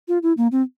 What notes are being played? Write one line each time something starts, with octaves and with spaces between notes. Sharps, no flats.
F4
E4
A#3
C4